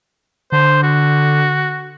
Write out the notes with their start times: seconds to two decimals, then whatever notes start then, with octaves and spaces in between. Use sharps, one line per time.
0.52 D3 C5
0.83 F#4